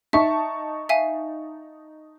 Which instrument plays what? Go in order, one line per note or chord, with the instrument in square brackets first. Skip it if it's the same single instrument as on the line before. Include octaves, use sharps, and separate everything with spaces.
[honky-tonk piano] D#4 A5 C#6 [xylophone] E5
[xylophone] E5 F5 G#5